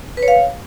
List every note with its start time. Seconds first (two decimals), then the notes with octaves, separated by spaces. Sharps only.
0.17 B4
0.23 C#5
0.28 F5